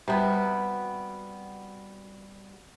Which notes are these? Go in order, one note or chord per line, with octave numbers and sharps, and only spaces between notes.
C3 G3 B3 F#4